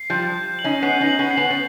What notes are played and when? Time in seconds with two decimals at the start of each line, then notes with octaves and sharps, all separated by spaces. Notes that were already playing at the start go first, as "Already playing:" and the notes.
Already playing: C7
0.10 F3 G3 G6
0.34 G6
0.59 F#7
0.64 C#4 D#4
0.82 B3 C#4 C7
1.00 C#4 D#4
1.06 F#7
1.19 B3 C#4
1.31 C7
1.37 B3 C#4
1.50 B3